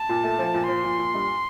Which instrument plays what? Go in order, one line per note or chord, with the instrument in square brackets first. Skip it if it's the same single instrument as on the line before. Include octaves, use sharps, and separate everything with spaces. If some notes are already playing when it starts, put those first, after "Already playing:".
Already playing: [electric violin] A5
[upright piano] A#2
A3
F3
A#2
[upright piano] F3 [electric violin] C6
[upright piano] A#2
A#2
G2